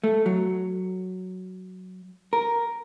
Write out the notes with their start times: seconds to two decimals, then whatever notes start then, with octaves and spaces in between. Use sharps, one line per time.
0.04 A3
0.26 F#3
2.33 A#4